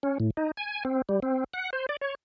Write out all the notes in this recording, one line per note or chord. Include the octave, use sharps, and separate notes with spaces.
C#4
A2
D#4
G#5
C4
G3
C4
F#5
C5
D5
C#5